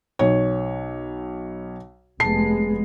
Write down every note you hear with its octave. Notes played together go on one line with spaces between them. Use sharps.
B1 C#5
F1 G#3 B3 A5 C7